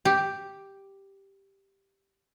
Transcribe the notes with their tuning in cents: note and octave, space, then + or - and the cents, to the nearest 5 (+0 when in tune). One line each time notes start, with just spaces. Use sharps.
G4 +0